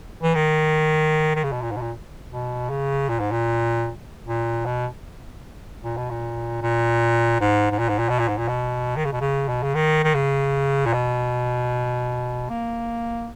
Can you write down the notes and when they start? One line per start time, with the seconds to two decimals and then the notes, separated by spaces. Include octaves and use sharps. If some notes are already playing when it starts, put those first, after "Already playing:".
0.22 E3
0.35 D#3
1.36 D#3
1.43 C#3
1.52 B2
1.62 A#2
1.71 G#2
1.76 B2
1.81 A#2
2.30 B2
2.70 C#3
3.09 A#2
3.20 G#2
3.31 A#2
4.27 A#2
4.66 B2
5.83 A#2
5.97 B2
6.10 A#2
6.62 A#2
7.41 G#2
7.71 G#2
7.79 A#2
7.89 G#2
7.99 A#2
8.09 B2
8.19 A#2
8.28 G#2
8.38 A#2
8.48 B2
8.97 D#3
9.05 C#3
9.13 B2
9.21 C#3
9.48 B2
9.62 C#3
9.75 D#3
10.04 D#3
10.14 C#3
10.86 A#2
10.93 B2
12.49 A#3